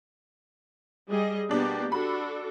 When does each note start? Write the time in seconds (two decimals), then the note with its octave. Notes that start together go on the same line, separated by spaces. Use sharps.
1.10 G3 G#4 D#5
1.49 B2 A#3 B3 D4 G4
1.92 D4 F#4 A4 B5